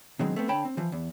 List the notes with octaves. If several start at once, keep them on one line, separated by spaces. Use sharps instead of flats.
B2 D3 D#3 F#3 G#3 C4
A3 B3 C4
D3 C#5 G5 A5 B5
C4
E3 F3
E2